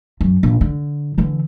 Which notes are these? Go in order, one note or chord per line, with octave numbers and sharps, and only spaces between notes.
F#2
A#1
D3
D3 E3